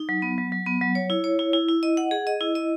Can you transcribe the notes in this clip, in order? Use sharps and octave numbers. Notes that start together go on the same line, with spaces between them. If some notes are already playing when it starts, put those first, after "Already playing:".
Already playing: D#4
F#3
B3
F#3
F#3
B3
F#3
C#5
E4
C#5
E4
E4
E4
D#5
F#5
G#4
D#5
E4
D#5